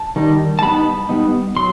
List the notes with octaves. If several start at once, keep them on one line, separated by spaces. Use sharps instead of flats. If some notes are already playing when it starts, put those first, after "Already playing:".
Already playing: A5
D#3 G3 D#4
A5
G3 B3 D#4 B5
G3 B3 D#4
F#3 C6